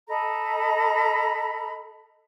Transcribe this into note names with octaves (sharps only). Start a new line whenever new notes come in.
A4 D#5 A#5 B5